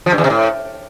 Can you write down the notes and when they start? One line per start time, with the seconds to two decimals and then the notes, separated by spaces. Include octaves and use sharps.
0.06 F3
0.12 G2
0.18 E2
0.24 C3
0.30 A2